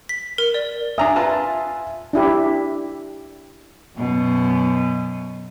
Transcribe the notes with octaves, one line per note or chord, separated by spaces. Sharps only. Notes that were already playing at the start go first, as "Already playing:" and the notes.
B6
A#4
D5
D4 E5 G#5 A#5 D#6
F4 B4 A5
D4 E4 G4
F#2 B2